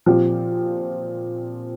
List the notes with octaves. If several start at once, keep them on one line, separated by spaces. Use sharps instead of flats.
A#2 F3 C4 G4